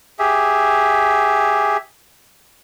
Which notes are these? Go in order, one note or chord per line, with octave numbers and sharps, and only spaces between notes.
G4 G#4 E5